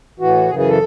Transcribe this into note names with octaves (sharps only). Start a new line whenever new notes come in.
A2 E3 F#4
F#2 C#3 E3 G#4
G#4
A4